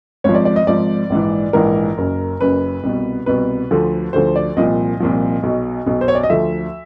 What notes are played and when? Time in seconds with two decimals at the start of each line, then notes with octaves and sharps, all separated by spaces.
0.24 G#1 G#2 F3 C#5
0.35 D5
0.45 D5
0.56 D#5
0.67 G#1 G#2 F3 D5
1.10 A#1 G#2 E3
1.53 A#1 G#2 E3 A#4
1.97 F#1 F#2 C#3
2.41 F#1 F#2 C#3 B4
2.83 C2 B2
3.26 C2 B2 B4
3.71 D2 D3 F3
4.13 D2 D3 F3 C5
4.36 D5
4.56 C2 A#2 F3 D#5
5.00 C2 A#2 F3
5.43 B1 B2
5.86 B1 B2
6.01 C5
6.08 C#5
6.15 D5
6.23 D#5
6.30 D2 D3 F3 E5